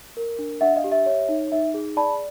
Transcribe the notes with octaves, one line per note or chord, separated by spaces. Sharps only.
A#4
D4
D4 E5 F#5
D#5 F5
G4
E5
C#5
D#4
D#4 E5
G#4
D5 A5 B5